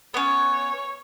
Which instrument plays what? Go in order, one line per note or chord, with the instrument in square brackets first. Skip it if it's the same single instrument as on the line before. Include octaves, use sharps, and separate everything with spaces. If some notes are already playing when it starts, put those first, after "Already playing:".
[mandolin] B3 C#4 [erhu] C#5